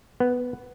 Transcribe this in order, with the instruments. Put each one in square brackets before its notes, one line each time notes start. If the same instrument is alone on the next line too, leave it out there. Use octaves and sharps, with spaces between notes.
[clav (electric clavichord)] B3